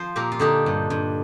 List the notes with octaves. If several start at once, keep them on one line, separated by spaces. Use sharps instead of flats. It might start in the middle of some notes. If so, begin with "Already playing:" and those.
Already playing: F3 C5
A#2 G4 A#4
F4
D3 D#4 G4
G2
G2